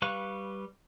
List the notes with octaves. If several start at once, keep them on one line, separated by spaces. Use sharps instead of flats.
G3 B4 F5 C#6 F#6